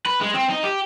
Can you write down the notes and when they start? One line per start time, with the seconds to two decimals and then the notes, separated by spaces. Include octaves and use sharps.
0.06 B4
0.21 G#3
0.34 C4
0.50 D#4
0.64 G4